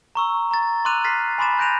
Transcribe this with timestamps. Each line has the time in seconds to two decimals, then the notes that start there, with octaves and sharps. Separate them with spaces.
0.15 A#5 C#6 E6
0.51 A#5 A6
0.85 C6 D6 E6 F#6 D#7 F7
1.04 F6 A6 B6 C7
1.38 G#5 B5 C6 D6 A6 E7
1.58 F#6 G6 A#6 D7 D#7 F7